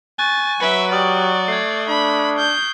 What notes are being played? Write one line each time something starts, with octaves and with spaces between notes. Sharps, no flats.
G#5 C#6 F#6 A6
F#3 B4 E5 C#7 D7
G4 D5 D#6 F6 F#7
A3 G#6 C7
D4 B5
F6 G6